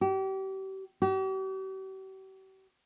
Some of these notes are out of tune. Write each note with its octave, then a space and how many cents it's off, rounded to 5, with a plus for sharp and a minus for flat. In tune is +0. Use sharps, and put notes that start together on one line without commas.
G4 -35
G4 -45